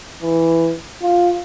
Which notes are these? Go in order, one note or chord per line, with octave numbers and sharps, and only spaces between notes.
E3
F4